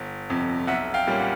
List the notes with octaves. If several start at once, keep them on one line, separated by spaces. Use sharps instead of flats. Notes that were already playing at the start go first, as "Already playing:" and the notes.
Already playing: G1
F2 C3
B1 E5 F#5
F5 G5
A#2 G3 A#3 C#4
F#5